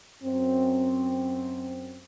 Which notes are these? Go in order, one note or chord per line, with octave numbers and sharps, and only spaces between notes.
F#2 C4